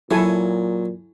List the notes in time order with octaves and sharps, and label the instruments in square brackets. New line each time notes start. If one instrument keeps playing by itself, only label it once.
[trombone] A#2 [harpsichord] F#3 [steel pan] E4 A4 G#5